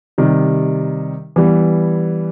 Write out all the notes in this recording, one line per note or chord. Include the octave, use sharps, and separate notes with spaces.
C3 D#3 G3
E3 G3 B3